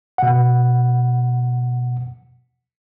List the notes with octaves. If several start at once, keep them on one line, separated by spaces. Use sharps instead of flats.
B2 F#5